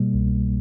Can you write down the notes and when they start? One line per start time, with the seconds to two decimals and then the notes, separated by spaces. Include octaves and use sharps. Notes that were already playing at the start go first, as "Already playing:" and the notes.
Already playing: B2 G3 A#3
0.14 C2